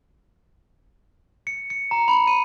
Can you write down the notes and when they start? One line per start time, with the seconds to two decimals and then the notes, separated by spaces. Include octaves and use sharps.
1.47 C#7
1.70 C#7
1.91 A#5
2.08 B5
2.27 D#7